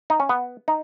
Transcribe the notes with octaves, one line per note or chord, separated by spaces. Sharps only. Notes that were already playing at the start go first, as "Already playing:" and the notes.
D#4
C#4
B3
D#4